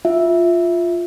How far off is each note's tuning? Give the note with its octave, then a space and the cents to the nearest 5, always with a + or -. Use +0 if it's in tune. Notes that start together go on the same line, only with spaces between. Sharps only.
F4 +0 E5 +0